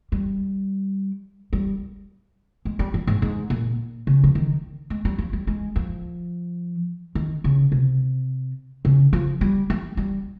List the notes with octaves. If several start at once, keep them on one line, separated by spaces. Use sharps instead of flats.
G3
G3
G#3
G3
F3
G#2
G#2
A#2
C#3
F3
D#3
G#3
G3
F3
G3
G#3
F3
D#3
C#3
C3
C#3
F3
G3
G3
G3